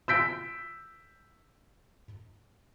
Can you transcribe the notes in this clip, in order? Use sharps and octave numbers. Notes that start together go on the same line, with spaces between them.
E6 G6 B6 D7